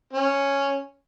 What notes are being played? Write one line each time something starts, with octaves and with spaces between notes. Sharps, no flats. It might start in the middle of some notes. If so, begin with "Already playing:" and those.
C#4